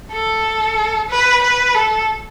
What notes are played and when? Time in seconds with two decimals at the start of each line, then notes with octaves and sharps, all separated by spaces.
0.12 A4
1.10 B4
1.43 B4
1.75 A4